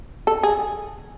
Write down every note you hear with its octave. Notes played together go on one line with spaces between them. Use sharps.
A4
G#4